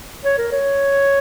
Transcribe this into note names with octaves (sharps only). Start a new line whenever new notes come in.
C#5
A#4
C#5